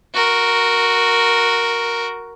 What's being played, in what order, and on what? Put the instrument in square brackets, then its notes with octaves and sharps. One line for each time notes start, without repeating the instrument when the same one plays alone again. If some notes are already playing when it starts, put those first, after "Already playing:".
[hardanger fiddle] F#4 A#4